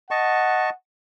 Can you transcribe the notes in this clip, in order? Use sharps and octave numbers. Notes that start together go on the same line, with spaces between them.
D#5 F#5 A5 C#6